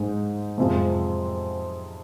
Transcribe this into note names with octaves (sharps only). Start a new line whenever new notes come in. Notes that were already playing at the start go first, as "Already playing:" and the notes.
Already playing: G#2 G#3 D#4
F2 C3 G#3 C4 F4